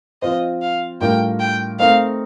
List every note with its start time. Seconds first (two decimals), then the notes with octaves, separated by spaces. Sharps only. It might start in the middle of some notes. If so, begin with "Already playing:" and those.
0.22 F3 C4 F4 C5 D#5
0.62 F5
1.01 A2 G3 D4 F4 A#4 G5
1.40 G5
1.79 A3 C4 D#4 A#4 F5